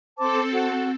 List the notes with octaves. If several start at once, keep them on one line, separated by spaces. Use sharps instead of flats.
C4 A4 C5 A5 D6
F#4